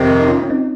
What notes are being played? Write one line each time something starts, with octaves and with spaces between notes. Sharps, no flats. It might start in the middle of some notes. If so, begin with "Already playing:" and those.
Already playing: F2 C3 D#3
D#4
C#4 F4
C#4
C4 D#4